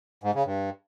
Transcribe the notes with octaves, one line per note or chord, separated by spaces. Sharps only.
G#2
C#3
G2